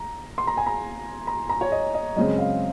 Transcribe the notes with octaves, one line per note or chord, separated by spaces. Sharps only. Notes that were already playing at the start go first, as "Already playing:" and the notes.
Already playing: A#5
C6
A#5
G#5
A#5
A#5
A#5
C#5
D#5
D#5
F#2 C#3 G#3 C4 D#5
F5